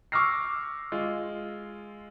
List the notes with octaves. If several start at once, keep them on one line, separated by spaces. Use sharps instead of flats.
C#6 D6 E6 F6 A#6 C7
G#3 F4